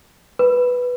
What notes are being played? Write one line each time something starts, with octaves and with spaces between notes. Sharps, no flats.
B4